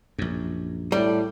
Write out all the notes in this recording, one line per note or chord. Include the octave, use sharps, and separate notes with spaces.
A#1 F#2
A2 G3